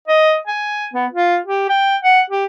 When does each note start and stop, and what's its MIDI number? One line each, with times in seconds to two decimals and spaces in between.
0.08 0.37 75
0.47 0.87 80
0.93 1.06 59
1.12 1.38 65
1.47 1.65 67
1.69 1.97 79
2.03 2.21 78
2.30 2.45 67